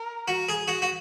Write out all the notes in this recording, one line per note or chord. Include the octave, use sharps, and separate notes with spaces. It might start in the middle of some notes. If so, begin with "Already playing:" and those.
Already playing: A#4
F#4
G#4
F#4
F#4